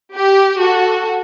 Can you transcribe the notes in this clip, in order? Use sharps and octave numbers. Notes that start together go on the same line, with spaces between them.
G4
F#4 A4